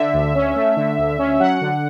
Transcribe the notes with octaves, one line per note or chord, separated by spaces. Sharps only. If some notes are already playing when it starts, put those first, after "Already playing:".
Already playing: D3 E5
D2
C#4
A3
D3
D2
C#4
F#3 F#5
D3